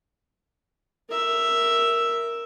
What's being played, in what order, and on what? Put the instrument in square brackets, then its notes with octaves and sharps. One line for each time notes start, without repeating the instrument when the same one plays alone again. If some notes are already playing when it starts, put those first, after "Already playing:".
[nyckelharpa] A#4 E5